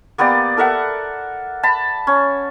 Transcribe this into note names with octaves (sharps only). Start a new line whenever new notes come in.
A#3 B3 G4 D5
A4 A#4 E5 F#5
A5 B5
C#4